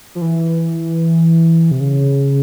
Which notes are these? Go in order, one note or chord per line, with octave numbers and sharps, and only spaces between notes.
F3
E3
C3
C#3